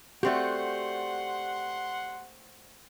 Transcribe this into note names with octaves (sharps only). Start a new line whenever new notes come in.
A3 C4 F#4 G4 D5 F#5 C6